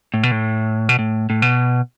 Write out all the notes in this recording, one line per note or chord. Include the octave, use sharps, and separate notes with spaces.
A2
B2
A2
B2
A2
A2
B2